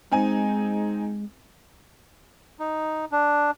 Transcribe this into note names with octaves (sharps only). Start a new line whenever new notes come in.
G#3 C4 D#4 G#5
D#4
D4